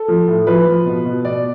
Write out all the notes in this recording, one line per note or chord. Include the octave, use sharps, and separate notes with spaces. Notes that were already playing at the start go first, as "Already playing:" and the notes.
Already playing: A4
F3
A2
F3 B4
F3
B2
B2
B2 D5